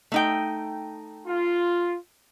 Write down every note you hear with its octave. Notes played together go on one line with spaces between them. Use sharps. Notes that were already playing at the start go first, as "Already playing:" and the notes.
A3 D#4 G5
F4